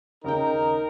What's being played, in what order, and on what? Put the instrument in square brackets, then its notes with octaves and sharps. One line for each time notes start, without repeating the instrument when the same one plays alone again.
[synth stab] D#2 C#3 G5 [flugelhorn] D#4 [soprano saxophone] A#4